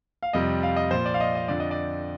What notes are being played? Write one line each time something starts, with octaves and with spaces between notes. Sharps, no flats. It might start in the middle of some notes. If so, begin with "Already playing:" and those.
F5
F2 C3 G3 D#5
F5
D#5
A#2 F3 C5
D5
F5
D#5
D#5
F2 D3 F3 D5
D#5
D5